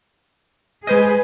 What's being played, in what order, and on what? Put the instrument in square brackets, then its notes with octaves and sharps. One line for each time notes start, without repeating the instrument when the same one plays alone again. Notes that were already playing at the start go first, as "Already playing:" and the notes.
[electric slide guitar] G#3 C5 D#5 [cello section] G#4 B4